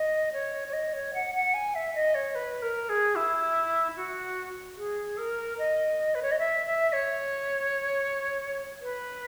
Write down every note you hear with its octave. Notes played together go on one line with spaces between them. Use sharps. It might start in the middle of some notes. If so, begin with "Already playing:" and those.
Already playing: D#5
C#5
C#5
D#5
C#5
F#5
F#5
G#5
E5
D#5
C#5
B4
A#4
G#4
E4
F#4
G#4
A#4
D#5
B4
C#5
D#5
E5
E5
C#5
B4